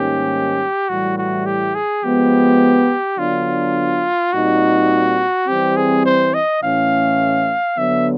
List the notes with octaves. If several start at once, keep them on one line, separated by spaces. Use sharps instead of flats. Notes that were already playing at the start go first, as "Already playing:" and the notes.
Already playing: G#2 D#3 G3 A#3 C#4 G4
A2 E3 G3 F#4
F#4
G4
G#4
F3 G#3 B3 G4
D3 F#3 B3 D4 F4
A#2 G3 C4 D#4 F#4
E3 G3 C4 G4
G#4
C5
D#5
A2 E3 A3 C#4 F5
D3 F#3 B3 E5